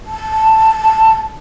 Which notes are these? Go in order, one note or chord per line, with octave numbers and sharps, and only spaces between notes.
A5